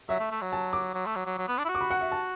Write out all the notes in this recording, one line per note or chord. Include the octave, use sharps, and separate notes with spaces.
F#3 E5
A3
A3
F#3
A5
D6
F#3
A3
F#3
F#3
F#3
B3
D4
E4
F#4
D6
B5
F#5
E5
A5